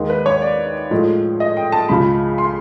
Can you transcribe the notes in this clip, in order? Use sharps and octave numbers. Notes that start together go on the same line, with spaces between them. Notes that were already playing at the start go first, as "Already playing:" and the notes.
Already playing: D#2 D#3 G#3
B4
C#5
D5
A2 F3 G#3
D#5
G5
A5
C#2 C#3 F3 B5
C6